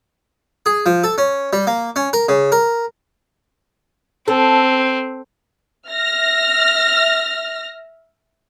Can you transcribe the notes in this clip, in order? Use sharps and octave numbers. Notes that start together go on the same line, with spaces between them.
G#4
F3
A4
C#4
G3
A#3
C#4
A#4
C#3
A#4
C4 A4
E5 F6 A#6